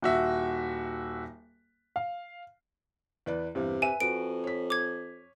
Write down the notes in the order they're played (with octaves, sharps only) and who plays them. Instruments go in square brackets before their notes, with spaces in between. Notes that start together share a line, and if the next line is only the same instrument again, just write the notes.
[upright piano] D#1 F#4 E5
F5
[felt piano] E2 B4 D5
[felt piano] E2 G2 [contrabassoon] C3
[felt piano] B4 E5 D#7 [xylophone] G#5
[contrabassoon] F2 [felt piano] F#4 B4 [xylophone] D7
[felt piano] C#5 B6
[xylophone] D6 G#6